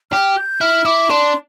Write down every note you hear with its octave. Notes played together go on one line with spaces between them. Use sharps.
G4 F6
G6
E4 F6
E4 D6
D4 C6